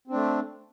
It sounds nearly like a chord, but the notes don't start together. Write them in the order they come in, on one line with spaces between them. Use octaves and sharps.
C4 D4 A3